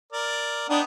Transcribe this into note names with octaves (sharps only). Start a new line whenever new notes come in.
A#4 D5
B3 D4 D#4 G4